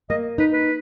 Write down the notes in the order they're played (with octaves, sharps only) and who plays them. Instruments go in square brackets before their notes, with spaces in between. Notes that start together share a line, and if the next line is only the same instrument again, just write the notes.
[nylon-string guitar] A#3 [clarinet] D#5
[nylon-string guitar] D#4 [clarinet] B4
[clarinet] B4